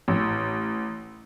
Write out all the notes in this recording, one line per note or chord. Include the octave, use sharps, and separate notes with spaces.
A1